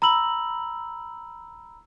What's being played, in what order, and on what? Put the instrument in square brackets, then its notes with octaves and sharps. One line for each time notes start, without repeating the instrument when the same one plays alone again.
[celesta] A#5 B5 E6 F#7